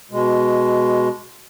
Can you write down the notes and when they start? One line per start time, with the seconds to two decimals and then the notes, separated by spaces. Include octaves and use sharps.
0.11 B2 G#3